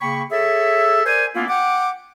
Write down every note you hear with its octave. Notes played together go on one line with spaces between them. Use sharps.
C#3 A#3 G5 B5 C#6
G#4 A4 C#5 E5
A#4 C5 D5 G#5
A#3 B3 C#4 D4 E4 F4
F#5 G5 D6